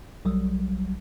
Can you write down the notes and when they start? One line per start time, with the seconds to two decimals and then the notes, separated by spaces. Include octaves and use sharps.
0.25 B1 F#3 G3